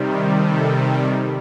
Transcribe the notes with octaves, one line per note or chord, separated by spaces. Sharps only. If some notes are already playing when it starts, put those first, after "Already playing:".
Already playing: C3 D#3 G3
A4